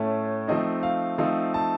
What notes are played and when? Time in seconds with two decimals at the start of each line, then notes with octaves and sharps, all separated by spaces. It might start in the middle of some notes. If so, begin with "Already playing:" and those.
Already playing: A2 A3 C#4 A5
0.48 F3 A3 C4 D#4 D#5
0.83 F5
1.18 F3 A3 C4 D#4 F5
1.54 A5